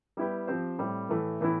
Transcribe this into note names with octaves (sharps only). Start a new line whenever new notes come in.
G3 B3 E4 G4 B4
F3 C4 G4 C5
A2 G3 C4
A2 E3 A3
A2 E3 B3 E4